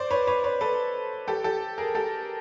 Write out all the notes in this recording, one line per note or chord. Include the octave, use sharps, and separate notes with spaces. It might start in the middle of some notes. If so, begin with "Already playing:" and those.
Already playing: C5 D5
B4 C#5
B4 C#5
B4 C#5
A4 B4
G4 A4
G4 A4
G#4 A#4
G4 A4